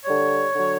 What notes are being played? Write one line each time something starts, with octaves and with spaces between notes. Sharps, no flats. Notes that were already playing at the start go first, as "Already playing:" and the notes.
D3 G3 C#5
D3 F#3